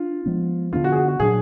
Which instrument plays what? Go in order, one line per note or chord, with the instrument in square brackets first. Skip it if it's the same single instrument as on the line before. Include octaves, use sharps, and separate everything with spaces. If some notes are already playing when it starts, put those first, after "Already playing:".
Already playing: [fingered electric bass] D4 [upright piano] F4
[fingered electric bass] F3 G#3 B3
[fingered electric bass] D3 F3 B3 D4 [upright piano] F4
[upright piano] F#4
G#4
F#4
F#4
[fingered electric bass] A#2 F#3 D4 [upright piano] G#4